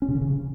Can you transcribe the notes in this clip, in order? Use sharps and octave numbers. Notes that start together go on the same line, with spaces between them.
C#4
C3
D3
C#3